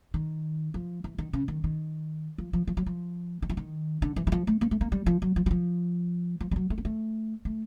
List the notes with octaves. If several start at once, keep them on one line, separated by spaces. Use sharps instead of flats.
D#3
F3
E3
D#3
C#3
D#3
D#3
F3
F3
F3
F#3
F3
D#3
E3
D#3
D3
E3
E3
F3
A3
A#3
A3
A#3
G3
F3
F#3
F3
F#3
F3
F3
G3
F#3
A3
A#3
A3
A3